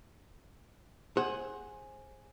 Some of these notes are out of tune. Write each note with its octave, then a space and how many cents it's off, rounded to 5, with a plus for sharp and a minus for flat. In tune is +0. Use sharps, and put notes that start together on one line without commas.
G#4 +0 C5 +25 F#5 +0